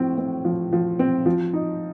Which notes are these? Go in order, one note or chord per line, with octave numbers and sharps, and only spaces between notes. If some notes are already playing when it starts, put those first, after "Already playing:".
Already playing: A2 F3 C4
C4
F3
F3
C4
F3
D#4